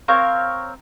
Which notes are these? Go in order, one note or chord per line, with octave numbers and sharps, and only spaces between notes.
C4 A#4 C#5 F5